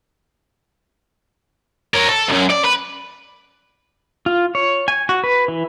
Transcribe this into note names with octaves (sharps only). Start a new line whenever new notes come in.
A#4 C#5
A4
B1 F#2
D5
B4
F4
C#5
G#5
F#4
B4
E3